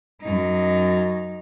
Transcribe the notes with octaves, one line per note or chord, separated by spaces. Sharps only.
F#2 D#4